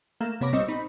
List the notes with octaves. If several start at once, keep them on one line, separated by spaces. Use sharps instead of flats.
A3 A#3 F5 A#5 E7
C3 B3 C#5 B5 D6 A#6
A#1 G3 C4 D#5 C#6 E6
C4 D#4 B5